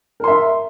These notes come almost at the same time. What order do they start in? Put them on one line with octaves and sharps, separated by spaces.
A#4 C6 E5